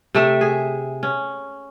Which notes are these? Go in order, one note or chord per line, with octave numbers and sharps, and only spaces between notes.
C3 A3 E5
G#4
C#4